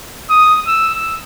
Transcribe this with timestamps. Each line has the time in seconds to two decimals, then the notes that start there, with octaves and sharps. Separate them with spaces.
0.30 D#6
0.67 E6